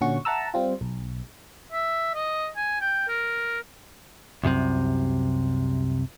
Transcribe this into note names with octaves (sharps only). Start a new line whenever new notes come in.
A#2 D3 C#4 F#4 C#6
E5 F#5 A5 A#5 E6
G3 C4 F4
B1
E5
D#5
G#5
G5
A#4
C2 F#2 A2 C3